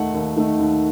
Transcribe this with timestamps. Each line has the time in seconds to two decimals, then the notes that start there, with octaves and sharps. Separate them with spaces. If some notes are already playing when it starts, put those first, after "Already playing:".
Already playing: D#2 D#3 A3 D#4 F#5
0.14 D#2
0.36 D#3 A3 D#4
0.59 D#2